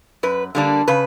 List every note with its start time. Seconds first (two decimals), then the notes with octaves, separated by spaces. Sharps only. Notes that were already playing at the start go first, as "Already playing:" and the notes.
0.23 F#2 B4
0.55 D3 G3 A#3 D4
0.88 C#3 B4